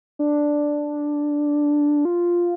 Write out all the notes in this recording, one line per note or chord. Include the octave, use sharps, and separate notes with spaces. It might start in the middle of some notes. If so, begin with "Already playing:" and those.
D4
F4